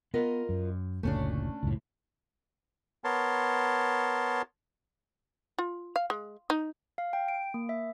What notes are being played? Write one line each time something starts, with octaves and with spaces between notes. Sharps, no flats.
B3 F4 A#4 D#5
F#2
F#1 D2 A#2 A3 C#4 D4
C#2 F#2 A2
B3 A#4 C#5 A5 C6
F4
F5
G#3
D#4
F5
G5
D7
A#3
E5